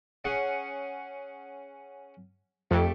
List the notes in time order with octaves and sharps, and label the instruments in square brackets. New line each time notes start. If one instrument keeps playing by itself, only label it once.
[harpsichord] C#4 G#4 F#5
[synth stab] F2 [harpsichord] A3 G4